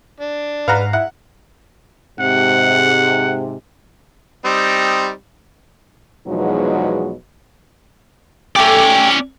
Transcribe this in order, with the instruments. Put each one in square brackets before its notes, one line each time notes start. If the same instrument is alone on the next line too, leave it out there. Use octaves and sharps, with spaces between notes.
[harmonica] D4
[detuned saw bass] G#2 [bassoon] B4 [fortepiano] F5 F#5 A#5
[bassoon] E4 [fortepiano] F#5
[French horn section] G#2 C3 [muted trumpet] F#5
[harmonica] G3 C4 D#4
[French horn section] E2 B2 F3 F#3 G#3 D#4
[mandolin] A3 G4 [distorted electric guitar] C#4 D5